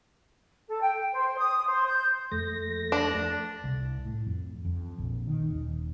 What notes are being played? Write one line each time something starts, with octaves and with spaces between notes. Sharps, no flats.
A4
G5
C5
D#6
C5
G6
F2 A3 A#6
D4
C2
A2
F2
F2
A#1
D#3
D#1